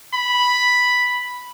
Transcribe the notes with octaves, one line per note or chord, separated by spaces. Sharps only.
B5